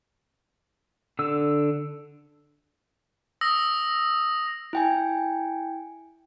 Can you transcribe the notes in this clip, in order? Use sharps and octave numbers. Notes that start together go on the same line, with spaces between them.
D3 E6
D#6 E6 A#6
E4 G5 G#5